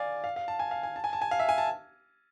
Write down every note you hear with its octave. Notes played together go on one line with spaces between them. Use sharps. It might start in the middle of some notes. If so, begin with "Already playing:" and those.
Already playing: D5 F5 G#5
F5
F5
A5
G#5
F5
G#5
A5
G#5
A5
G#5
F5
E5
G#5
A5